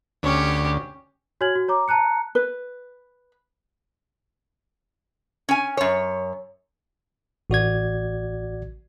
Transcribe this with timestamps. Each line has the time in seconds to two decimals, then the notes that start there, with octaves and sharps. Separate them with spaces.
0.23 D2 C#4 G4
1.41 F#4 C#5 G#5 F6 G#6 F#7
1.56 F#4
1.68 C#5 A#5 D6
1.88 A5 A#5 F#6 C#7
2.35 B4
5.49 C#4 G#5
5.77 F#2 C#5
7.50 A1 F#4 D5 G#6